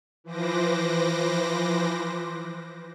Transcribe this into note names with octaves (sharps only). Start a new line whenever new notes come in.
E3 F3 B4 C5 D6 A#6